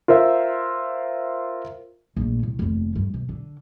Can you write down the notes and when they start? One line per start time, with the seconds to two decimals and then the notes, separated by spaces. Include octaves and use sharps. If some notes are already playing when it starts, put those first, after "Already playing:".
0.08 F4 A#4 C5 E5
2.16 A#1 A3
2.43 C2
2.59 F1 D#2
2.95 G2
3.14 B2
3.29 D3